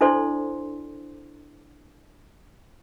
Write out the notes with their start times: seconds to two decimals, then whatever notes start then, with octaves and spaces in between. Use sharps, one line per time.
0.01 D4 E4 A4 C5 D5 C6